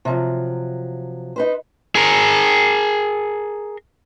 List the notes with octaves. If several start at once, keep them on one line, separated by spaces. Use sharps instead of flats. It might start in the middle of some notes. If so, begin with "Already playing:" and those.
C3 F3 F#3
D#4 B4 C5
G#4 A#4